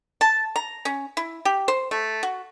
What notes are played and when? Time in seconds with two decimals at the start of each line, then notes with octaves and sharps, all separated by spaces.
0.21 A5
0.56 A#5
0.85 C#4
1.17 E4
1.45 G4
1.68 C5
1.91 A3
2.23 F#4